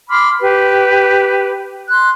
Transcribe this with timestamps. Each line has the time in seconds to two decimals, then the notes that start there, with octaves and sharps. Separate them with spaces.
0.09 B5 C6 D6 F6
0.40 G4 B4
1.89 C6 F#6